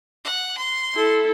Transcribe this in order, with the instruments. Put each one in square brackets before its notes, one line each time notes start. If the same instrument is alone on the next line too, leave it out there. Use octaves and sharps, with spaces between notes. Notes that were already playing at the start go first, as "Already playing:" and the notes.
[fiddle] F#5
C6
[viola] E4 A4